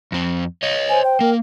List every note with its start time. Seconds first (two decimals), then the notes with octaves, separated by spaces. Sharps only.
0.12 F2 C4
0.63 C#5 D#5
0.89 C5 G#5
1.04 G5
1.21 A#3 A#4